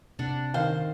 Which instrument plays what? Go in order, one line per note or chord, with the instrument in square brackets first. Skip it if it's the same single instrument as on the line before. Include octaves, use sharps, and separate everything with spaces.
[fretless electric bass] C3 [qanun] D4 F#5
[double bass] D#3 [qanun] C5 [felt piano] F5